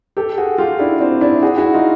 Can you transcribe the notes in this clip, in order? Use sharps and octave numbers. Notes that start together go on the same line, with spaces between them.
G4 A4
F#4 G#4
F4 G4
D4 E4
C4 D4
D4 E4
F#4 G#4
E4 F#4
D#4 F4